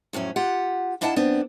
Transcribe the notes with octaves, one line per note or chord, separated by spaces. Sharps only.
F2 A2 F#3 C#4
F4 G4 F#5
A#3 D4 E4 D#5 F#5 A5
F#2 B3 C4 D4